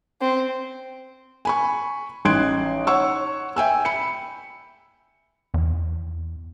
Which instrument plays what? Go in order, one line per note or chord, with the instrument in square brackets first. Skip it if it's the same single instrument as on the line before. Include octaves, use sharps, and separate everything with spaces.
[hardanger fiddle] C4
[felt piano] G#5 B5 C#6
A1 D#4 C6 F#6 G#6 D7
C#5 F#5 C#6 E6
E5 G5 G#5 E6
B5 C#7
[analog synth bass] E2